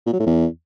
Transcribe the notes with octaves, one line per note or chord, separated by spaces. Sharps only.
A#2
F#3
A2
E2